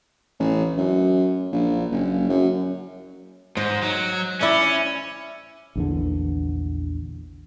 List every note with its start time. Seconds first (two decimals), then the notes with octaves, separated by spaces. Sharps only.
0.40 A1
0.77 F#2
1.52 A#1
1.91 F#1
2.29 F#2
3.57 G#2 C5 D#5
3.83 F#3
4.41 C#4 E4 D5 E5
5.75 A#1 E2 D3